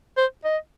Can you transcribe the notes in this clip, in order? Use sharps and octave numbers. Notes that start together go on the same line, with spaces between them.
C5
D#5